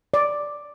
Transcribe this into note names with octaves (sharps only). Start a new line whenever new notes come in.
D5